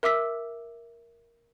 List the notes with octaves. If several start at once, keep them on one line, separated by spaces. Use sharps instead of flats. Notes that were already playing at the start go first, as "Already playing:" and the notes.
A#4 E5 D6 E6 B6